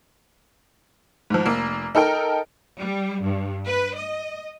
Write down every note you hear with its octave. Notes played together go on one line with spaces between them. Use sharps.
G#2 F3
F1 A#3
D#4 A4 A#4 G5
G3
G2
B4
D#5